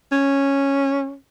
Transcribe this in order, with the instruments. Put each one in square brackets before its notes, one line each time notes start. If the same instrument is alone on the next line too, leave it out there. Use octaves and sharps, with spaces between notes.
[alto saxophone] C#4